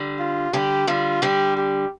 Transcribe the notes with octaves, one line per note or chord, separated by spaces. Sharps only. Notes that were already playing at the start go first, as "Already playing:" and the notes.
Already playing: D3 G3
F4
D3 G3 G4
D3 G3 F4
D3 G3 G4
G4